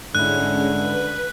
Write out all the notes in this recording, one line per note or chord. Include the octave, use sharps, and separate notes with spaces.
G#2 D3 G#3 C#4 E4 F#6
B4